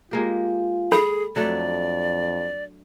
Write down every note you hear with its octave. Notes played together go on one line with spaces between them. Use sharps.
G#3 A#3 F4 G4
G#4 A4 B5
F2 F#3 A3 D4 D5